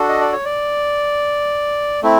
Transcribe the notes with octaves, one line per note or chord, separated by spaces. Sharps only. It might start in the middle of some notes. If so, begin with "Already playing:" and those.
Already playing: D4 F#4 A4
D#5
D5
C#5
D5
A3 C4 E4